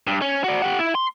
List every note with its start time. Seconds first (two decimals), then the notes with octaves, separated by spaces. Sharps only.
0.07 G2
0.22 C#4
0.44 F#4 D5
0.62 G4 F#5
0.79 E4
0.95 C6